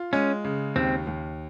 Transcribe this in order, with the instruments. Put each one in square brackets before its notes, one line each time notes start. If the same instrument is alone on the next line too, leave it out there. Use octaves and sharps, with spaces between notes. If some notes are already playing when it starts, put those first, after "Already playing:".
Already playing: [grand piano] F4
[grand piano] G#3 [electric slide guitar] C#4
[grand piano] C#3
[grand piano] D#2 [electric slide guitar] C4
[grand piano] D#2